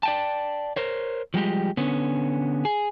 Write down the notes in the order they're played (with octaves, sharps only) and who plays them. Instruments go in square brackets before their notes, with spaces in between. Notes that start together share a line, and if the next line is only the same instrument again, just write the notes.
[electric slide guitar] D5 G5 A5
A#4 C5 C#5
F3 G3 G#3 G4
D3 B3 C#4
G#4